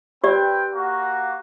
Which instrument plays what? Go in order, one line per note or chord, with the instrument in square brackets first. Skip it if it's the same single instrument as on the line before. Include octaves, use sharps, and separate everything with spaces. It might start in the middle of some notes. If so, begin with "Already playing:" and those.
[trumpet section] C4 B4 G5 [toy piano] G4 D5
[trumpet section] A#3 F#4